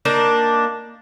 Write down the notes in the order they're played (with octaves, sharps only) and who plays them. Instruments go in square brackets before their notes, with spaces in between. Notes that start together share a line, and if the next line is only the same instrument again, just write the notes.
[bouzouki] A#3 D4 D#4 D5